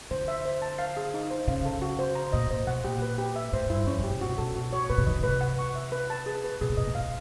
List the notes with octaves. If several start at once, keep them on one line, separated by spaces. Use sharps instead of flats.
D3 C5
E5
C5
A5
F5
G#4
D#4
C5
C#3 F5
A4
F#4
C5
A#5
A#2 D#5
A#2 C5
B2 F#5
A#2 G4
B4
G4
E5
A2 C5
G2 E4
F2 C#4
A2
G4
C3
B2 F#4
B2 A4
B2 F#4
C#5
B2 B4
C3
D#3 D#5
C#3
C3 B4
F#5
C#6
E5
B4
A5
G#4
B4
B2 G#4
A#2
B2 D#5
C3
B2 F5